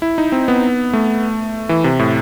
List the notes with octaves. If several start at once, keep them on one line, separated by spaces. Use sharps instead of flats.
E4
D#4
C4
B3
A3
E3
C3
A2